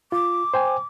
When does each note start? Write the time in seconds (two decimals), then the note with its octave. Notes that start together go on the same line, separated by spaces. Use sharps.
0.12 F4 D6
0.54 C5 G5 G#5